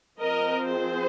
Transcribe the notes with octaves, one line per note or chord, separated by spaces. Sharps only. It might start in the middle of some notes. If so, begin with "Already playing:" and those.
F3 C4 A#4 D#5
G#4 C5